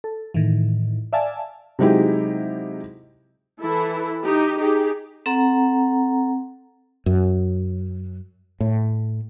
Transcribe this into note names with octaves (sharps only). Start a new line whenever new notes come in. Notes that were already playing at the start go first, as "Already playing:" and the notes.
A4
A2 D#3 E3
D5 E5 F5 G#5 A5
C3 F#3 G#3 D#4 E4 G4
E3 E4 A4
D#4 G4
D#4 G4 G#4
C4 A4 F#5 A#5
F#2
A2